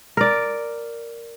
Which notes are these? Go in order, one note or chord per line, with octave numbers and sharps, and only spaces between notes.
A#4 D5